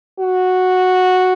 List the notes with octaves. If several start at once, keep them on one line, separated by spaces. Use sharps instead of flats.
F#4